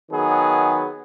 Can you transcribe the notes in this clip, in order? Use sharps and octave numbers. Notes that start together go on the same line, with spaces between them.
D#3 F#3 B3 G#4